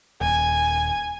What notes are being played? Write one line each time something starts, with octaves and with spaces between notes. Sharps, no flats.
D#1 G#5